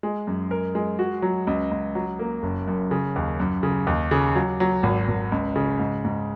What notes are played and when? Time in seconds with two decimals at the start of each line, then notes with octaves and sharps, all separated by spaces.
0.03 G#3
0.27 F#2
0.51 A#4
0.75 G#3
0.99 F#4
1.22 F#3
1.47 C#2
1.71 C#2
1.95 F#3
2.19 A#3
2.43 F#1
2.68 F#2
2.91 C#3
3.16 D#2
3.40 F#2
3.63 C#3
3.87 D#2
4.11 C#3
4.35 F#3
4.60 F#3
4.83 G#1
5.08 G#1
5.32 C#2
5.56 C#3
5.79 G#2
6.05 G#2